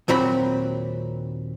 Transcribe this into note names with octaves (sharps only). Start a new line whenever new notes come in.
D#2 A#2 F#3 C4 B5